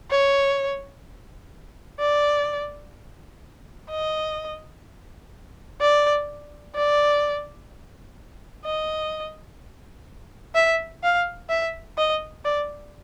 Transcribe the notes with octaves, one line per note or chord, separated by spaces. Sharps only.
C#5
D5
D#5
D5
D5
D#5
E5
F5
E5
D#5
D5